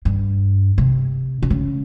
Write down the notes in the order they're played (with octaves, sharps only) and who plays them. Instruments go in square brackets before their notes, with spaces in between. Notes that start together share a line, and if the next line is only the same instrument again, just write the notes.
[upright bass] G2
C3
D3
C#3